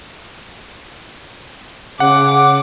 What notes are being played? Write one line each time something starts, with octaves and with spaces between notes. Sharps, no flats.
C#3 F#5 D6